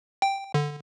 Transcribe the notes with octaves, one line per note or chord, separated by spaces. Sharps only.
G5
D3